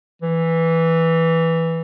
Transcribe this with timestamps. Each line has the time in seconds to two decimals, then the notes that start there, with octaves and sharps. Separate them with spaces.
0.22 E3